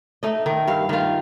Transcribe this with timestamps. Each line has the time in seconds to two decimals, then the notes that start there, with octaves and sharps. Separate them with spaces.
0.23 A3 D#4 D#5
0.46 D#3
0.68 G2 F5
0.89 D#3 F4 F5